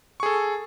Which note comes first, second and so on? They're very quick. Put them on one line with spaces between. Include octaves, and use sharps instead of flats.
C#6 G#4 A4